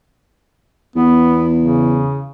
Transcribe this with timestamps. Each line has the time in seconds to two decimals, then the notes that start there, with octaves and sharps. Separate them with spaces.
0.96 E2 B3
1.60 C#3